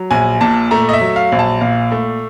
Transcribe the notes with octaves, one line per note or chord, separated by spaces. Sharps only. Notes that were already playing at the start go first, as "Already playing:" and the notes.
Already playing: F#3
A#1 G#5
A#2 A5
A3 A#5
D#5
E5
F#3
F5
A#1
A5
A#2 F5
A3